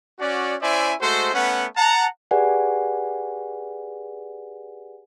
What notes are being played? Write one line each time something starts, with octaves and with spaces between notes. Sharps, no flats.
C#4 F#4 D5
C#4 E4 C5 D5 E5 G#5
G#3 A3 F#4 A4 C5
A3 B3 C#4 B4 F#5
F#5 A5 A#5
G4 G#4 B4 D5 F#5 G#5